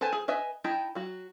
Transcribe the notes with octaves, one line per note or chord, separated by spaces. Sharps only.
A4 B4 C5 G#5 A5
G#4
B4 D#5 E5 G#5
D#4 E4 D#5 G5 A5
F#3 F#4